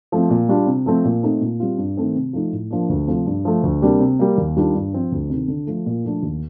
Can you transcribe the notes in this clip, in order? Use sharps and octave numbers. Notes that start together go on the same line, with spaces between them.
F3 A3 C4
A#2
G3 D4 F4
C3
F3 A3 C4
A#2
A3 C4 D#4
A#2
G3 C4 F4
G2
D#3 A3 C4
C3
F3 A3 D#4
A2
F3 A#3 D4
D2
C3 F3 A3
G2
F3 A3
D2
C3 G3 A#3 D4
C3
G3 A#3
D#2
D#3 G3 D4 F4
G2
F3 C4
D2
C3 D#3
D3
F3 A3
A#2
F3 A3 D4
D#2